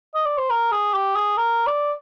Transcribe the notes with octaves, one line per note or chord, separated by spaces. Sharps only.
D#5
D5
C5
A#4
G#4
G4
G#4
A#4
D5